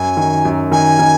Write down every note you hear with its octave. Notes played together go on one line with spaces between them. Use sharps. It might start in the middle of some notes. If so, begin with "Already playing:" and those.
Already playing: F#2 G#5
D#3
F#2
D#3 G#5
D#3